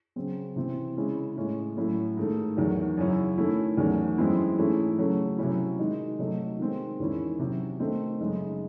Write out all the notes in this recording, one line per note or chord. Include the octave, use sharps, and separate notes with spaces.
C#3 F#3 C4
C3 E3 C4
C#3 G#3 C#4 E4
A2 G#3 C#4
A2 F#3 C#4 E4
G#2 D#3 A3
E2 D#3 F#3
F#2 C#3 F#3 C#4 E4
D#3 A3 C#4 E4
E2 D#3 F#3 A3 C#4
F#2 E3 G#3 C4 E4
G#2 E3 A3 C#4 E4
C#3 F#3 A3 C#4
C3 F#3 C#4 E4
D#3 G#3 D#4
C3 F#3 A3 D#4
D#3 G#3 C4
E2 D#3 G#3 C#4 E4
C3 F#3 C#4
D#3 A3 C4 D#4
F#2 C#3 G#3 D#4